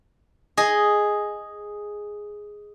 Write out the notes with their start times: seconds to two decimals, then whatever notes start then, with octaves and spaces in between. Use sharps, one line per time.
0.57 G#4 D#5